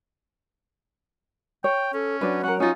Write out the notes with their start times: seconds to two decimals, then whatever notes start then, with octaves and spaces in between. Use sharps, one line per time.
1.64 C#5 G5
1.93 C#4 A4
2.21 F#3 D4 B4
2.43 C#4 A#4 F#5
2.60 C#4 D#4 F4